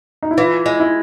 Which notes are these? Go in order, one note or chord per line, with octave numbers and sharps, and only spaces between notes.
D#4
E4
E3 F4
G#3
E4